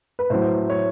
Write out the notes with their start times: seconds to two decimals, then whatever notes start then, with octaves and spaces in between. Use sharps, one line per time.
0.19 B4
0.30 A2 F#3 C5
0.70 C#5